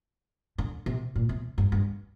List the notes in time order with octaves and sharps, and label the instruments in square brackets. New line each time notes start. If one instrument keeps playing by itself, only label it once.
[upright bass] D3
C3
A#2
C3
G2
G2